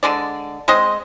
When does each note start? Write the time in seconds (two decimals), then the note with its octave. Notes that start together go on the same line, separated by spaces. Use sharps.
0.03 D3 G#3 D5
0.68 G#3 C4 C5 D#5